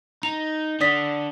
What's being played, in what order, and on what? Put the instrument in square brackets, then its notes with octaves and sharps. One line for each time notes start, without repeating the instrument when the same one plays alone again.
[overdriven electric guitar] D#4 [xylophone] F7
[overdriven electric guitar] D3 [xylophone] D5 D#6 B6